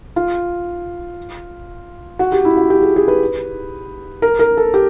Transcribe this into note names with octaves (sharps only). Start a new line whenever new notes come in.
F4
F#4
G4
E4
F#4
G4
G#4
G#4
B4
A#4
A#4
A4
G4